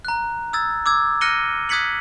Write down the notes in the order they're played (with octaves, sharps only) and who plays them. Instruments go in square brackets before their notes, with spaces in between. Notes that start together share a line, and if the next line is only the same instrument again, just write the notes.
[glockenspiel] A#5 F#6
D#6 E6 G#6 A6
D6 E6 G#6
F6 F#6 A#6 C#7 D#7 G7
D#6 F#6 G#6 B6 C#7 F#7